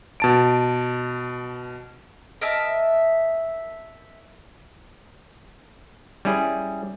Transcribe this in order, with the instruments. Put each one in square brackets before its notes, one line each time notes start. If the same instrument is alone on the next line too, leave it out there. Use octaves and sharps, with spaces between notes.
[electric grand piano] B2 A5 D7
[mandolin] A#4 D#5 E5 A5
[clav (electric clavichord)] G3 C#4 E4 G#4